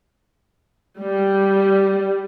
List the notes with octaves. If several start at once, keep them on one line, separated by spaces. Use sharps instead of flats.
G3